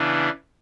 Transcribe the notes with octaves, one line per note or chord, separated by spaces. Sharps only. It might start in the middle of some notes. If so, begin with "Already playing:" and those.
Already playing: C#3 E3 B3 D4